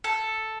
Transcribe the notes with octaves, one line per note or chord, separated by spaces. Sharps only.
A4